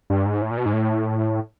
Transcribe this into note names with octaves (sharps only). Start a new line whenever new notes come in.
G2
G#2
A2
A#2
B2
G#2
A2